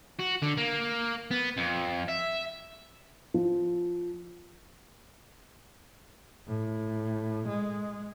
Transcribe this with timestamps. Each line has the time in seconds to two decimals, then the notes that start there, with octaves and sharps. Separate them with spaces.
0.19 F#4
0.42 D3
0.57 A#3
1.31 B3
1.57 F2
2.08 E5
3.34 F3
6.48 A2
7.49 G#3